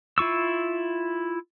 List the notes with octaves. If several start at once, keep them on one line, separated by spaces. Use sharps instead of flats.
E4 F4 C#6 E6